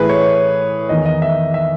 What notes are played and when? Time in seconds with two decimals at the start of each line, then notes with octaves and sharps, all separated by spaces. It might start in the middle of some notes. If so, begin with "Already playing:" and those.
Already playing: A2 E3 G#4 B4
0.09 C#5
0.89 E2 D#3 D#5
1.06 D#5
1.22 E5
1.54 E5